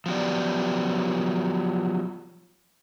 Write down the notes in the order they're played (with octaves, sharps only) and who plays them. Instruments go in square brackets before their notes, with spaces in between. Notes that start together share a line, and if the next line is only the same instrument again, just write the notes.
[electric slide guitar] F3 F#3 B3 G4 D5